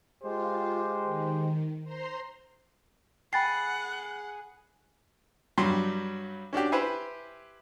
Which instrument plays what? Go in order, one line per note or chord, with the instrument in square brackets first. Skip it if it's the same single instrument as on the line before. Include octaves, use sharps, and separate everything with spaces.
[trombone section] G#3 G4 C5 [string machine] F4
[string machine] D#3
C5 A#5 C6
[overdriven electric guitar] G#4 [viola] F#5 [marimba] G5 [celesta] B5 A6 C7
[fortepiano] G2 F#3 G3 C6
C#4 D4 F#4 G4
E4 G4 B4 C5 E5 G#5